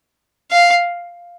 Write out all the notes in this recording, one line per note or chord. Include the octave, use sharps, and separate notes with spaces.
F5